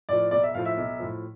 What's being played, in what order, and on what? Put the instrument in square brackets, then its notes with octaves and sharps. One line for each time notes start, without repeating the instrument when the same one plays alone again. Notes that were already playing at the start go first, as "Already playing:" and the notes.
[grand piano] A2 F3 D5
B1 D5
E5
A2 F3 F5
E5
B1
A2 F3